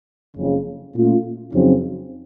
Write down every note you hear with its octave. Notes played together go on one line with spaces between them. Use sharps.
F#1 F2 C#3
A#2 A3 C#4 F4
F2 C#3 F#3 C4 D#4